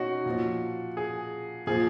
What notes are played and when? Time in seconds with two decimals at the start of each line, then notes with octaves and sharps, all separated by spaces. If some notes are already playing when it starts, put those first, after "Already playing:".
Already playing: B2 C#4 D#4 F#4
0.26 A#2 F3
0.97 G#4
1.67 A#2 F3 G#4